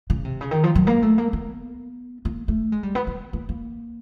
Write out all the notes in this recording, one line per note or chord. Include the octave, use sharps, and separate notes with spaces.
C#3
C3
C#3
D#3
F3
F#3
A#3
A3
A#3
B3
A#3
A3
G#3
G3
B3
B3
A#3
A#3